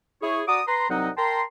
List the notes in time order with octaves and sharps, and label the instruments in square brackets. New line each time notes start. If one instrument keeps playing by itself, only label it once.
[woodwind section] E4 G#4 C#5
F#4 D5 A#5 D6 D#6
B4 A#5 C6
C2 F#3 C4 D#4 D#5 F#5
A#4 G5 A5 A#5 C6